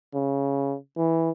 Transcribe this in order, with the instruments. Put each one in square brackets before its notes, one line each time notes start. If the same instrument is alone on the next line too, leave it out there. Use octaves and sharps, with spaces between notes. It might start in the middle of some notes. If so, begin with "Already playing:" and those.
[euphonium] C#3
E3